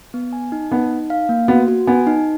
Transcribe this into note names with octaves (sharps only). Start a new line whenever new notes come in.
B3
G#5
D#4
B3 D#4
D#4
F5
A#3
B3 F#4
F#4
B3 G#5
D#4